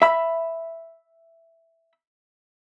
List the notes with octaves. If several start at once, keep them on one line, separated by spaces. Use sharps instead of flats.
E5 B5